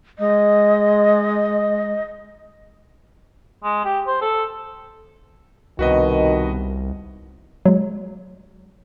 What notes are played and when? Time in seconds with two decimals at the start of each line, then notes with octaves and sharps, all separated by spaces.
0.19 G#3 D#5
3.64 G#3
3.85 G4
4.07 C5
4.22 A4
5.79 C2 B2 D#3 F#4 B4 D#5
7.65 F#3 G#3